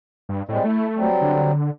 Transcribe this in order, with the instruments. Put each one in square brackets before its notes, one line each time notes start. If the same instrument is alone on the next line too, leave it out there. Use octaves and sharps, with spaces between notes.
[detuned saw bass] G2
[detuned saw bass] A2 [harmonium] G3 G#3 C4
[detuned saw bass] A3 [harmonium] E4
[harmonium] F#3 G3 C4
[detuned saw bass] D3